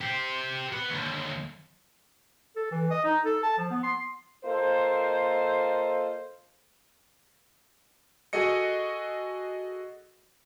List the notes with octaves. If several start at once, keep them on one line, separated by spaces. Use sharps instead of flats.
G4 C5
B4 F#5
D#2 D3
A4
E3
D#5
D#4
A4
A5
F3
B3
C6
A#3 F4 A4 C5 D#5
F#4 G#4 A4 D#5 C#7